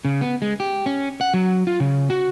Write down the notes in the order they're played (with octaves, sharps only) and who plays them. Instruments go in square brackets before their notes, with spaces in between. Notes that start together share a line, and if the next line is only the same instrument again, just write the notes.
[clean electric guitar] C#3
B3
G#3
G4
C#4
F#5
F#3
F4
C#3
F#4